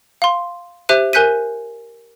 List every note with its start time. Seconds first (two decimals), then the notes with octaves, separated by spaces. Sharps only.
0.22 F5 C6
0.89 G4 C5 E5 F#6 D#7
1.13 A#4 G#5 F#6 G6 B6 D#7